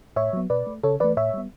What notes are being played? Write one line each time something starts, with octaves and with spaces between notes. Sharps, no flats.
A2 C#5 E5
F#3 B3
B2 B4 D5
A3
C#3 A4 C#5
E3 A3 B4 D5
A2 C#5 E5
G3 B3